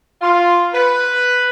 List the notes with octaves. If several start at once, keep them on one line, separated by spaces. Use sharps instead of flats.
F4
B4